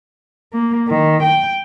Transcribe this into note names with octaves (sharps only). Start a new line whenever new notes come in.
A#3
D#3
G5